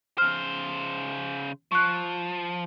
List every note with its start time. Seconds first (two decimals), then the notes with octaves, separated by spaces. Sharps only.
0.18 C#3 C5 F6
1.72 F3 C#6 F#6